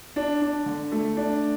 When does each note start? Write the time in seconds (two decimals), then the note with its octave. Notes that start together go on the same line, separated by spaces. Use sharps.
0.16 D4
0.42 D4
0.66 D3
0.92 A3
1.17 D4